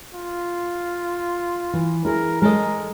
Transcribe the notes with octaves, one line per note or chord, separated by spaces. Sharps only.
F4
E3
E4 G#4 A#4
G#3 A4 A#4 D#5